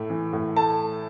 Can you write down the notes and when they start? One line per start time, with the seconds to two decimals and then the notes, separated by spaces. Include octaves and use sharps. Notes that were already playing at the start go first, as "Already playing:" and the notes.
Already playing: A2 A3
0.10 E3
0.33 A2
0.56 A3 A5